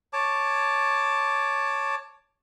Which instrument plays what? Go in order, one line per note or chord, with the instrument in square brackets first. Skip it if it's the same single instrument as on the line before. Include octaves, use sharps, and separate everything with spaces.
[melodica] C#5 A5 D6